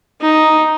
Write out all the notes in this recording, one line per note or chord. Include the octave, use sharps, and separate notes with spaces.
D#4